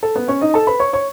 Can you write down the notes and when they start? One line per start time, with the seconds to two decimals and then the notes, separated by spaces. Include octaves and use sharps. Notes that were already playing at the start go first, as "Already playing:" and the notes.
0.03 A4
0.16 B3 B4
0.28 C#4 C#5
0.41 D#4 D#5
0.54 A4 A5
0.67 B4 B5
0.80 C#5 C#6
0.93 C#5 C#6